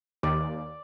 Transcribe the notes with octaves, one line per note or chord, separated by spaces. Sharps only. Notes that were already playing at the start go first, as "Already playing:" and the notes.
D#2 D5